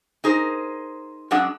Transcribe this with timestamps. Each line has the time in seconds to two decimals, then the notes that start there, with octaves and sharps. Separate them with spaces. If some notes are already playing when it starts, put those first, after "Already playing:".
0.24 D#4 G#4 A#4 C5
1.31 F#2 G#3 D4 G#4 F#5